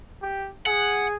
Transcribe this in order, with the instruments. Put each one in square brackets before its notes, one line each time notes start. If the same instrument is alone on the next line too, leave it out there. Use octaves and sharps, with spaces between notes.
[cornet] G4
[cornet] G#4 [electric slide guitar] F#5